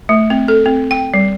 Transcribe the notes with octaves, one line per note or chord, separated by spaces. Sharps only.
A3
C4
A4
C4
G5
G3